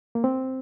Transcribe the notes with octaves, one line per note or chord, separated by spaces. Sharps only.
A#3
C4